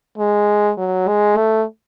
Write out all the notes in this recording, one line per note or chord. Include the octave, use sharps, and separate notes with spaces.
G#3
F#3
G#3
A3